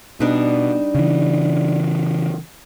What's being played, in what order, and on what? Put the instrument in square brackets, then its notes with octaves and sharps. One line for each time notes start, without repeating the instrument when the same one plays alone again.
[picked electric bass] B2 [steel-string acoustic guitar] G3 D4 D#4
[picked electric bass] C#3 E3